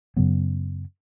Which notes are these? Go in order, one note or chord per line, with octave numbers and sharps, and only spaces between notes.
F#2 C#3 F#3 B3